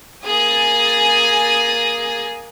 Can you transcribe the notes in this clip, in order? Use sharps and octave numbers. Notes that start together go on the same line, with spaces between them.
A#3 G#4 G#5 D#6 A6